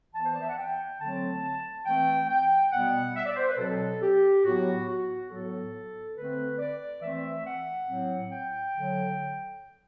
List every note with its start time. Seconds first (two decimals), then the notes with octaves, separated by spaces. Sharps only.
0.14 E3 B3 A5
0.25 C5
0.33 D5
0.41 E5
0.49 F#5
0.58 G5
1.00 D3 F#3 A3 C4 A5
1.86 E3 A3 C4 G5
2.29 G5
2.72 B2 G3 B3 F#5
3.16 E5
3.26 D5
3.36 C5
3.47 B4
3.58 B2 F#3 C4 A4
4.02 G4
4.44 A2 F#3 B3 F#4
4.88 F#4
5.30 A2 F#3 B3 A4
6.17 D3 A3 C4 B4
6.59 D5
7.02 E3 A3 C4 E5
7.45 F#5
7.88 A2 F#3 C4
8.31 G5
8.75 D3 F#3